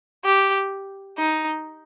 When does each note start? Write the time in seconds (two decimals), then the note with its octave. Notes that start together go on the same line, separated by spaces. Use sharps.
0.25 G4
1.18 D#4